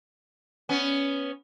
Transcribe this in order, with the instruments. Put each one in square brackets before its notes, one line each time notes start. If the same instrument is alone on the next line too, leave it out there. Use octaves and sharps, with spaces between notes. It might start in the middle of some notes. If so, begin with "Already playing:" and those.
[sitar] B3 C#4